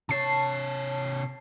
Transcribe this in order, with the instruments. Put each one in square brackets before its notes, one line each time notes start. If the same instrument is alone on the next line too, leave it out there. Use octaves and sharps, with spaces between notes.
[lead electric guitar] C3 C#5 [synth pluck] A5 C7